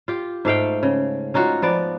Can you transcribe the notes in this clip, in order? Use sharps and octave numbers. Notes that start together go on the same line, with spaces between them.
F4 G4
G#2 A3 F5 G5
C#3
C#4 D#4 F4 F#4
F3 B3 D5